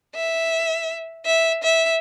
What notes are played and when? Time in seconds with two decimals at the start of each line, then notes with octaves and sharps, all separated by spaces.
0.15 E5
1.26 E5
1.63 E5